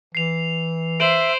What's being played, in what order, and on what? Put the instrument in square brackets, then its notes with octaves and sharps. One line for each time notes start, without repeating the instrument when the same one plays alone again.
[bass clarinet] E3 [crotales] C7 F7
[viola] C5 [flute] E5 [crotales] D7 F#7